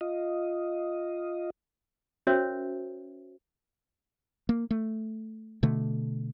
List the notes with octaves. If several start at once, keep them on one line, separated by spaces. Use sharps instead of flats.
F4 D#5
C#4 F#4 A#4 C5 C#5 E5
A#3
A3
B2 D3 A3